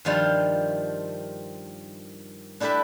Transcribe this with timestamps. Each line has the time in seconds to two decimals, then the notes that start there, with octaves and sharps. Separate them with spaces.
0.05 G2 D#3 F3 G3 F4
2.60 D4 E4 G4 A4 B4 E5